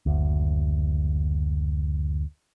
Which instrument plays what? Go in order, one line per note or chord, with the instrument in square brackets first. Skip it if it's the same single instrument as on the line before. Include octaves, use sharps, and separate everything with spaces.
[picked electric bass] F#1 D2